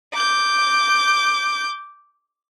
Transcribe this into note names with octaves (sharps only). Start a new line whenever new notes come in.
D6 G6